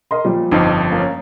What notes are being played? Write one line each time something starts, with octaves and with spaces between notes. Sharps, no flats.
A#4 D#5 C6
A#2 F3 G3
G1 F2 F3 D#4
A#3 C#4